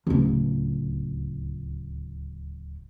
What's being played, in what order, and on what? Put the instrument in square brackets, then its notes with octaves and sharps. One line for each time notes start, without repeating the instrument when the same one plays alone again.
[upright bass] D1 C#2